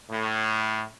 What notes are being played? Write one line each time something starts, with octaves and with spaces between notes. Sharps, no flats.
A2